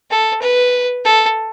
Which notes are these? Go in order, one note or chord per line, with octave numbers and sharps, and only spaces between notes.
A4
B4
A4